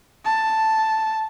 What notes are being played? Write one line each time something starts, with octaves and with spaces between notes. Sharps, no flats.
A5